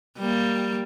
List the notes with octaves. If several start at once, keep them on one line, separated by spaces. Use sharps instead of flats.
G3 A#3